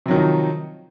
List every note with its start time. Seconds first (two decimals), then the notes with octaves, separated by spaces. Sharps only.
0.06 C3
0.08 F#3
0.11 D#3
0.13 F3
0.16 D#4